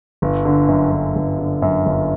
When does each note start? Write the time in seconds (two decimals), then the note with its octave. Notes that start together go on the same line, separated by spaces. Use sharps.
0.22 G1
0.45 D3
0.68 F#2
0.92 G1
1.16 G1
1.39 D3
1.62 F#2
1.86 G1